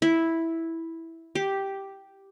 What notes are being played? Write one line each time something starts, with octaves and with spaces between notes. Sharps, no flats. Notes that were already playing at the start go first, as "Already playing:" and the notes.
E4
G4